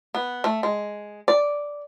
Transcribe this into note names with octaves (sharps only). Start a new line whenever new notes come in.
B3
A3
G#3
D5